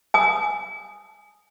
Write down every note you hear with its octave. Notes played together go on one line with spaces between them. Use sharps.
G#5 D#6